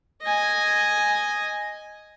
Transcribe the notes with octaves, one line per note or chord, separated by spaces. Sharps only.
D#5 G#5